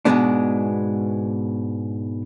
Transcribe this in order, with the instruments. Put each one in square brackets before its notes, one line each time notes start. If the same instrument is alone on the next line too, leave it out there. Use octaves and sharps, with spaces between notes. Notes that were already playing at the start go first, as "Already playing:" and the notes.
[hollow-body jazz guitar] G#2 B2 D3 G#3 B3 D4